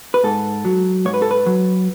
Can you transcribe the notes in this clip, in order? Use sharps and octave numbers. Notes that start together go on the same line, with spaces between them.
B4
G#2 A4
F#3
G#2 C#5
B4
A4
B4
F#3